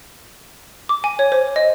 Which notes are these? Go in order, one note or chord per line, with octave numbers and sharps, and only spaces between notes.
D6
G#5
C#5
C5
D#5